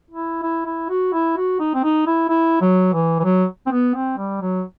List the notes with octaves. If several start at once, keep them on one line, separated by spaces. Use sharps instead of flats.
E4
E4
E4
F#4
E4
F#4
D#4
C4
D#4
E4
E4
F#3
E3
E3
F#3
C4
B3
C4
G3
F#3